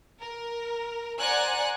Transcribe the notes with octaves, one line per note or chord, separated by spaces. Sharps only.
A#4
C5 D5 F#5 G#5 A#5 F#6